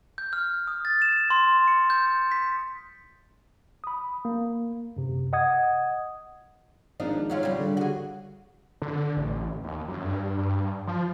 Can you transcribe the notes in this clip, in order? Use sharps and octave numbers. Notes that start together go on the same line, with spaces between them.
G6
F6
D#6
A6
E7
C6
C#7
G6
B6
B5 D#6
A#3
F#2 C3
D#5 F#5 D#6 G#6
G#1 F3 D4 D#4
F#3 C#4 F4
C#3 G3
D3
F#4 G#4
D3
A1
D#2
F#2
G2
G2
F3